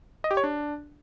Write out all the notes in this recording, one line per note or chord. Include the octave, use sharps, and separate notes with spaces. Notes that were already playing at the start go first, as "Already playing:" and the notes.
D#5
G4
C#5
D4